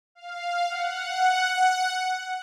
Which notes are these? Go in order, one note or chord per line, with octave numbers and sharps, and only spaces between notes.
F5
F#5